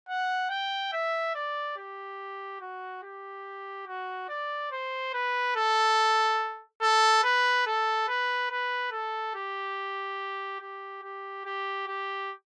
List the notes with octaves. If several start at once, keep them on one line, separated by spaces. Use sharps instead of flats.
F#5
G5
E5
D5
G4
F#4
G4
F#4
D5
C5
B4
A4
A4
B4
A4
B4
B4
A4
G4
G4
G4
G4
G4